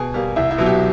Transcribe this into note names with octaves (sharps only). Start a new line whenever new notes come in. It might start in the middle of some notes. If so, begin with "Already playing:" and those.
Already playing: B2 G#4
G3 A#3
C2 E4
E4
B2 F#3
G4